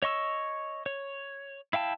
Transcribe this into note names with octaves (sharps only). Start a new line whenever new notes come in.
C#5 D#5 C#6 E6
C#5
E4 F5 G5 A5